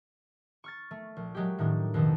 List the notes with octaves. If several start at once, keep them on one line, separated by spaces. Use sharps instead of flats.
C#6 F6 A6
A3
A#1
F#3 G#3 A3 G4
A2 D#3 G3 A#3 D4
F2 B2 D#3 A4